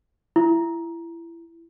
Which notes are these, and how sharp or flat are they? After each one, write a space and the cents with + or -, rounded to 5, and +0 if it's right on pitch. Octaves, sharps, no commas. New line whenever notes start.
E4 +25